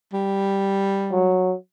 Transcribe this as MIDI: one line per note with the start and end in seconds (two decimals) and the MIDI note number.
0.13 1.42 55
1.11 1.55 54